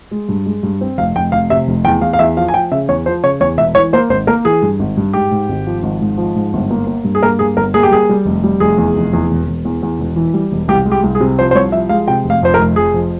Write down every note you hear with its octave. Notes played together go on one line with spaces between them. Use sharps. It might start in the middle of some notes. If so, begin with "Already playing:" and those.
G#3
G2
G#3
G2
C4
F1 F5
F1 G5
F1 F5
C3 E5
F1
E2 G5
E2 F5
F5
E2 E5
F3 F5
G#5
F3 G5
C#3 E5
E2 C#5
F3 C5
C#3 C#5
E2 C#5
E1 E5
E3 C#5
A#3 C5
G#1 C5
A#3 A#4
E3 G#4
G2
G#1
G2
G#2 G4
G#2
G#1
F3
G#1
G#2
F3
G#2
G1
A#3
A#3
G2
G#4
A#3 A#4
G2 G#4
G1 A#4
A#3 G#4
G4
G3 G#4
G3
F1
G3
F1 G#4
E2
F1
E2
E1
E1
E2
E2
E1
E3
G3
E1
C2 G4
G#3
G4
C2
G#4
C3
F3 C5
C5
C2 C#5
F3 E5
G#3 F5
C3 G5
F1
F5
F2 C5
A#4
F1
F1 G#4
F2